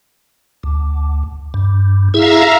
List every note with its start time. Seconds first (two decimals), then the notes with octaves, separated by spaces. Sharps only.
0.63 D2
1.54 G2
2.14 E4 G#4 E5 F5 A#5